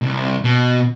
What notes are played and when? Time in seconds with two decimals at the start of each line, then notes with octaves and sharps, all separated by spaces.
0.02 C2
0.44 B2